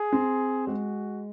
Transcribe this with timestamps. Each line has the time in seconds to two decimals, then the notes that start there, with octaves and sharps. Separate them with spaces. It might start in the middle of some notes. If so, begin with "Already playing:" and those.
Already playing: G#4
0.12 C4
0.67 G#3 F#4